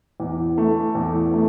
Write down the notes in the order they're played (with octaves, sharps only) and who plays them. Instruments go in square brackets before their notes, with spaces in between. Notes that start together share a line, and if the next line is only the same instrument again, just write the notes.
[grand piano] E2
A3
E2
A3